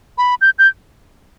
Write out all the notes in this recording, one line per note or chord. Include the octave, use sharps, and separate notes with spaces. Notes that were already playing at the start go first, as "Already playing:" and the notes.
B5
G6
G6